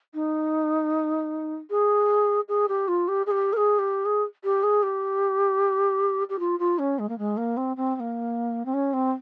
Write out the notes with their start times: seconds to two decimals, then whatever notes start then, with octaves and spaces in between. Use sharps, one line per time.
0.14 D#4
1.70 G#4
2.48 G#4
2.68 G4
2.88 F4
3.08 G4
3.26 G#4
3.31 G4
3.53 A#4
3.57 G#4
3.79 G4
4.05 G#4
4.44 G4
4.63 G#4
4.83 G4
6.29 G4
6.39 F4
6.59 F4
6.79 C#4
6.99 G#3
7.09 A#3
7.18 G#3
7.37 A#3
7.57 C4
7.77 C4
7.95 C4
8.00 A#3
8.65 C4
8.74 C#4
8.93 C4